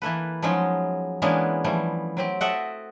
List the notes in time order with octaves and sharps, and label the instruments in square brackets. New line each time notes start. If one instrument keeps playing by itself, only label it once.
[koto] E3 A#3 A4 B4
F3 F#3 G#3 C#4 D#4
E3 G#3 A#3 B3 C#4 D4
E3 F3 G3 A3
F#3 C4 G4
F#4 A4 D#5 E5 F#5 G5